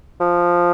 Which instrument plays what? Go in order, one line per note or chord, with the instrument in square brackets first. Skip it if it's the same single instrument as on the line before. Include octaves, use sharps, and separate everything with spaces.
[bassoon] F3